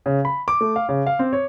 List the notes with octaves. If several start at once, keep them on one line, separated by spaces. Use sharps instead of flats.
C#3
B5
D6
A3
F5
C#3
F5
C4
C#5